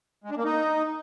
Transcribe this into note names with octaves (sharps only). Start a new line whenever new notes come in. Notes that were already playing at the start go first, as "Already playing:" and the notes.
G#3
D4
A#3
D#4